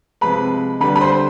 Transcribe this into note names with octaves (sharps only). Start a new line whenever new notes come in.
C3 F3 G#3 B4 B5
D3 G3 B4 B5
B5
C5 C6